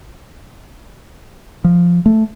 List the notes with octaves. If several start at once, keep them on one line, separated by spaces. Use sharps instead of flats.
F3
A3